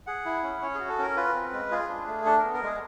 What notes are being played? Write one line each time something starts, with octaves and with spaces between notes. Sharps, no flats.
G#4 F#5
E4
C#4
C#4 C#5
F#4 G#4
A4
C#4 A#4
F4 B4
C4
G#3
F4 G#4
D4
A3
D4 A4
B3 A#4
A#4
G#3 G#4